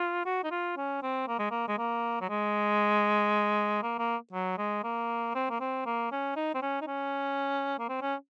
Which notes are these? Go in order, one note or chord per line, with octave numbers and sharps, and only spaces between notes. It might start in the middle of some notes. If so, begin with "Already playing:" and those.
Already playing: F4
F#4
D#4
F4
C#4
C4
A#3
G#3
A#3
G#3
A#3
F#3
G#3
A#3
A#3
F#3
G#3
A#3
C4
A#3
C4
A#3
C#4
D#4
C4
C#4
D#4
C#4
A#3
C4
C#4